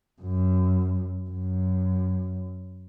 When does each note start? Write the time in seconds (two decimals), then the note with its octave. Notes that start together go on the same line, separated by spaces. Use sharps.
0.22 F#2
1.30 F#2